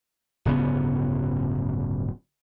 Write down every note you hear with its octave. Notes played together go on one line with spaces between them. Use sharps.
D1 G1 C#3 B3